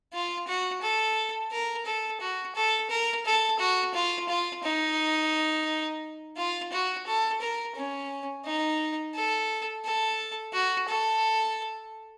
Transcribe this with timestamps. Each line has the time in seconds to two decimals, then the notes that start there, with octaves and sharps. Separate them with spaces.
0.13 F4
0.47 F#4
0.82 A4
1.52 A#4
1.86 A4
2.21 F#4
2.55 A4
2.90 A#4
3.25 A4
3.59 F#4
3.94 F4
4.28 F4
4.63 D#4
6.37 F4
6.72 F#4
7.07 A4
7.41 A#4
7.76 C#4
8.45 D#4
9.15 A4
9.84 A4
10.53 F#4
10.89 A4